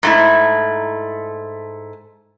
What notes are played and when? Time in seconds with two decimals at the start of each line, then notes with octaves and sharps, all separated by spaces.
0.03 G#2 A3 E4